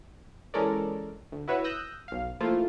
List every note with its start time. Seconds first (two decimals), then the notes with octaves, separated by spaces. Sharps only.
0.54 E3 G#3 C#4 A4 A#4 D5
1.32 D2
1.48 E4 F#4 B4 C#5 E5
1.64 D#6 E6 F#6 G6 A#6
2.08 B1 F5
2.40 F3 A3 A#3 E4 F4